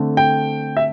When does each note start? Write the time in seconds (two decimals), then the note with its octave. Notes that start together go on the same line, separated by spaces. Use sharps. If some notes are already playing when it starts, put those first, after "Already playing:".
Already playing: D3 A3 C4
0.17 G5
0.77 E5